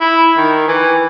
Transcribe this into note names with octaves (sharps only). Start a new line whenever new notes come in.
E4
D#3
E3